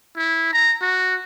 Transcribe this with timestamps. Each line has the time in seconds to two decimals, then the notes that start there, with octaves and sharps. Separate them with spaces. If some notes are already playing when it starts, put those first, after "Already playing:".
0.17 E4
0.52 A#5
0.82 F#4